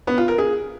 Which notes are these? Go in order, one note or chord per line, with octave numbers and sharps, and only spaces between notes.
B3
F4
A#4
G#4